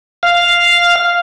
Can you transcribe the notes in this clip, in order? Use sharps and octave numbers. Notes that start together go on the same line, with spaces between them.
F5